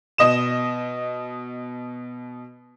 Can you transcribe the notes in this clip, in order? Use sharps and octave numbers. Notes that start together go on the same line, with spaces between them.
B2 D#5 D#6 E7